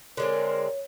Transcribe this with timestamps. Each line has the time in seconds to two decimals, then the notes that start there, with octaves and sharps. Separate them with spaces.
0.17 D3 G#3 C4 A#4 C#5